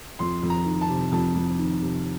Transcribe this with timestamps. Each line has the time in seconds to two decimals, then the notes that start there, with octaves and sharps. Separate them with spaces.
0.19 F2 C6
0.43 F2
0.50 A#5
0.66 D#3
0.81 A5
0.89 C3
1.12 F2 A5
1.35 F2
1.59 D#3
1.82 C3